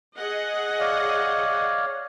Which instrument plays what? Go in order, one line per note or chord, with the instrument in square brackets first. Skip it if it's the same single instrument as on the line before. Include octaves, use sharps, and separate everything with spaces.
[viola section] G#4 D#5 F#5
[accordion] C#5 D5 F5